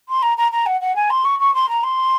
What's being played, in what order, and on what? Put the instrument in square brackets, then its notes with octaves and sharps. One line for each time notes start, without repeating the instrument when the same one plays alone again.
[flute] C6
A#5
A#5
A#5
F#5
F#5
G#5
C6
C#6
C#6
C6
A#5
C6